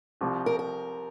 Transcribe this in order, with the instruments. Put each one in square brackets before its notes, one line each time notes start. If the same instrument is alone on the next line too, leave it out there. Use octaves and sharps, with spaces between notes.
[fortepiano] C2 C3 F3
[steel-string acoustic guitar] A#4
A#4